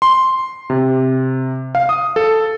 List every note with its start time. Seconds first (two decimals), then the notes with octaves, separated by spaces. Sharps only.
0.02 C6
0.70 C3
1.75 F5
1.89 D#6
2.16 A4